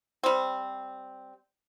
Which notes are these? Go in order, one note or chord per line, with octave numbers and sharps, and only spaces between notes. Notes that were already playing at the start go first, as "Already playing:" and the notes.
G3 C4